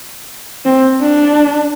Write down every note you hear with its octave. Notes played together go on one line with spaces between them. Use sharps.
C4
D4